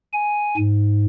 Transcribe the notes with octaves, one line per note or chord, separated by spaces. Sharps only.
G#5
G#2